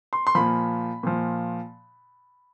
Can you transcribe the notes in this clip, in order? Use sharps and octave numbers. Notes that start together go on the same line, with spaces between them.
C6
C6
A#2 F3 B5
A#2 F3